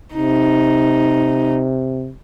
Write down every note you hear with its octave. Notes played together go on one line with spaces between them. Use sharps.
C3 D#4